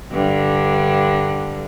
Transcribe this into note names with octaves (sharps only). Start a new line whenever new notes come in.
G2 D3